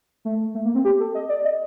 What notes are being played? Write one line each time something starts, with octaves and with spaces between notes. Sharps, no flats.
A3
A3
A#3
C4
G4
A4
D#5
D5
D#5